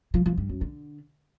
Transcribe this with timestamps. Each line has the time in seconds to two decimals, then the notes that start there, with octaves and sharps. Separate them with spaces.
0.14 F3
0.26 F3
0.37 G2
0.49 F#2
0.61 D3